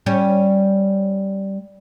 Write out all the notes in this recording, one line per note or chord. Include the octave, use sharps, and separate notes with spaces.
G3 C#4